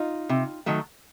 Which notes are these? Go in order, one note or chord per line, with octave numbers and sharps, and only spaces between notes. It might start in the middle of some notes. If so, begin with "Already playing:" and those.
Already playing: D#4 F4
C3
D#3 F#3 A3